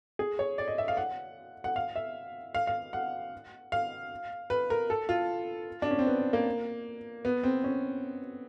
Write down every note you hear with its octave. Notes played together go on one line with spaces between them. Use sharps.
G#4
C#5
D5
D#5
E5
F5
F#5
F#5
F5
E5
F5
F5
F#5
F5
B4
A#4
A4
F4
D4
C#4
C4
B3
A#3
B3
C4
C#4